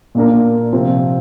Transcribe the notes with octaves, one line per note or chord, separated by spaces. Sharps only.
A#2 A#3 D4 A#4
C3 F3 C4 F4